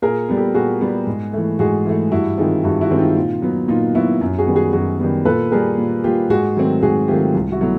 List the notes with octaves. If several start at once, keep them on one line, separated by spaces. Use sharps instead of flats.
A#2 G#4 A#4
G3 B3
G4 A4
A#2 F#4 G#4
G3 B3
G#2
E3 A3
G#2 F#4 G#4
E3 A3
G2 E4 F#4
D#3 G#3 C4 D#4 F4
G2 E4 F#4
E4 F#4
D#3 G#3 C4
D#4 F4
A#2
F#3 B3
A#2 D#4 F4
F#3 B3 E4 F#4
F#2
F#4 G#4
D#3 G3 B3
F#4 G#4
F#2 F#4 G#4
D#3 G3 B3
A#2 A4 B4
G3 A#3 G#4 A#4
A#2
G3 A#3 F4 G4
G#2 F#4 G#4
D#3 F#3 A3 C4
G#2 F#4 G#4
D#3 F#3 A3 C4 F4 G4
C2
E4 F#4
B2 F#3 A3